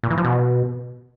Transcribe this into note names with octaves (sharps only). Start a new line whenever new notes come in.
A#2
E3
F3
B2